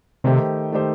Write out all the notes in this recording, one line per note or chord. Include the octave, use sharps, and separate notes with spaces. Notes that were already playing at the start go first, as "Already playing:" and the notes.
C3 D#3 A3 D#4 G4 C5
D#3 A3 D#4 G4 C5